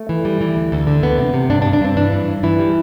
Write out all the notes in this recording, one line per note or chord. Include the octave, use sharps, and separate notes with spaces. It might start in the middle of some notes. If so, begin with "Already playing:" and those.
Already playing: A3
E3
G3
E3
D2
D2
D3
D2 B3
C3
C3
G2 D4
D4
G2
D4
G2 C4
E3 D4
G2
G2
E3 E4
G3